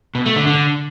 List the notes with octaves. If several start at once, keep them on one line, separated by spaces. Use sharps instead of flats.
B2
A3
D3
D3